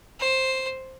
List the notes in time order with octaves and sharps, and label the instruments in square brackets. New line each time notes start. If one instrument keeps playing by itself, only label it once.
[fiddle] C5